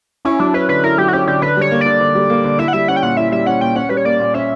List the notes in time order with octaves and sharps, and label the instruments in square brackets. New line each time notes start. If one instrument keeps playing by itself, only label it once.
[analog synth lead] C#4 [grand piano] E4
[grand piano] F#3 [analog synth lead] D4
[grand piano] C#4 [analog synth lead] B4
[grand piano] D3 [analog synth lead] B4
[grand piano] E4 [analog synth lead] A#4
[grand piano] F#3 [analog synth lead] G4
[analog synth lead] F#4
[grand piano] C#4 [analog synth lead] G4
[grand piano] D3 [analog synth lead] G4
[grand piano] D3 [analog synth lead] B4
[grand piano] G3 [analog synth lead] C#5
[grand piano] A#3
[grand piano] D3 [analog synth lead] D5
[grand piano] D3
G3
A#3
D3
[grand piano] E4 [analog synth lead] E5
[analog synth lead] F#5
[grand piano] G3 [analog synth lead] E5
[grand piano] C#4 [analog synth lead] F#5
[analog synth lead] G5
[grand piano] A#2 [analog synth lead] F#5
[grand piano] E4 [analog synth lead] E5
[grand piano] G3 [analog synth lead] E5
[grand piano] C#4 [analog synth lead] F#5
[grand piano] A#2 [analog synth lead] G5
[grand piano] C#4 [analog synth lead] F#5
[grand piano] G3 [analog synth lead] B4
[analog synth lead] C#5
[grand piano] A#3 [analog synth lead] D5
[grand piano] A#2
[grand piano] C#4 [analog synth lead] E5